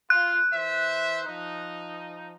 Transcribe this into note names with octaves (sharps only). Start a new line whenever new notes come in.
F4 F#6
E3 C5 E5
F3 D#4